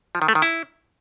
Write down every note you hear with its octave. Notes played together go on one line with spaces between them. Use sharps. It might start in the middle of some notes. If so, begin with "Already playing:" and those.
F3
D#3
A3
D#3
E4